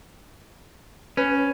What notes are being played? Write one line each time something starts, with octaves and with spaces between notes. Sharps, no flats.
C#4 B4